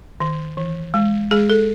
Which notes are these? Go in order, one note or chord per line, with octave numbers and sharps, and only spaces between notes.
D#3
E3
G#3
G#3 G#4
A4